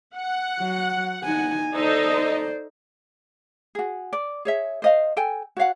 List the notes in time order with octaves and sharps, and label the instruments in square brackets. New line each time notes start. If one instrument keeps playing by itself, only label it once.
[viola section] F#5
[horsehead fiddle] F#3
D#4 G#5
[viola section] D#4 A4 D#5 [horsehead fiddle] C5 D5
[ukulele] F#4 G#4
D5
G#4 C#5 E5
C5 D#5 F5
A4 G5 G#5
F#4 C#5 F5 F#5